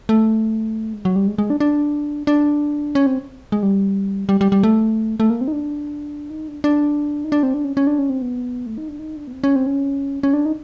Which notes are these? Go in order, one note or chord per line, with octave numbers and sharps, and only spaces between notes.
A3
G#3
F#3
G3
G#3
G#3
D4
D4
D4
C#4
C4
G#3
G3
G3
G3
G3
A3
A3
A#3
C4
D#4
D4
D#4
D4
D4
D#4
D4
C4
D4
C#4
C#4
D4
C#4
C4
B3
A3
D#4
D4
D#4
D4
B3
C4
C#4
C4
C#4
C#4
D4
D#4